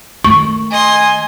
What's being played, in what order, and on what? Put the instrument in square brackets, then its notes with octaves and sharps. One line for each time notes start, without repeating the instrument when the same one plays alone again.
[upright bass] D#3 A3 [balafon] C#6
[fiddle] D#5 C6 [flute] G#5